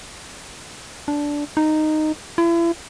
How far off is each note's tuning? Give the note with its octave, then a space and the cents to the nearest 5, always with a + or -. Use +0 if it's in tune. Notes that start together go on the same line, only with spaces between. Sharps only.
D4 -10
D#4 -10
E4 +40